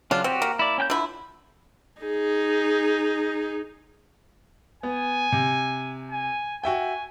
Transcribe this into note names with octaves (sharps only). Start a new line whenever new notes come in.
C#3 F#3 D4 F4
C4 F#4 G4
A#3
E4 D5
C#4 G5 G6
D3 E4 F4
D#4 G#4
B3 G#5
C3
G#5
F#4 E5 G5 G#5